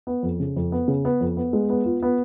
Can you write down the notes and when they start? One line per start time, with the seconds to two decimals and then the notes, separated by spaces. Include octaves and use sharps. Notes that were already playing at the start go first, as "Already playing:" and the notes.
0.07 B3
0.23 F2
0.40 C#3
0.56 F2
0.72 B3
0.88 C#3
1.05 B3
1.21 F2
1.37 B3
1.53 G#3
1.69 B3
1.85 F4
2.02 B3